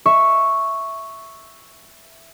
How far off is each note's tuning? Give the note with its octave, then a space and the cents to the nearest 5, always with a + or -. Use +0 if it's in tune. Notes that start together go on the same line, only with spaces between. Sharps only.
E5 +0 C#6 +0